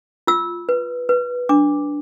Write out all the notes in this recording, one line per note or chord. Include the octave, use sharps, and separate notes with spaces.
F4 E6
B4
B4
D4 D6